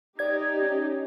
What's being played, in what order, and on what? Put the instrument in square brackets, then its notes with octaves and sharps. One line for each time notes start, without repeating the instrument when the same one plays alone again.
[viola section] D#4 G4 [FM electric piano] D5 G#6
[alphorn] C#4